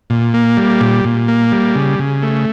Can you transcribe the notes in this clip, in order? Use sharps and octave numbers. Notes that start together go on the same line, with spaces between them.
A#2
A#3
G3
A#2
A#2
A#3
G3
C#3
C#3
A3